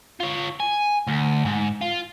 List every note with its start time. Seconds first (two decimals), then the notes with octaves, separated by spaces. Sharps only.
0.20 F4 C#5
0.60 G#5
1.07 D2
1.45 G#2
1.81 F4